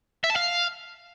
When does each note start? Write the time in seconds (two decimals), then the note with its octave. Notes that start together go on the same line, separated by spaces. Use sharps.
0.24 E5
0.30 A5
0.36 F5